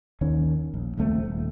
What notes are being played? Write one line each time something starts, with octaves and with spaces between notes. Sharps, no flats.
D#2 D#3 C#4
A#1
D#1 C#2 A3 C4
D#1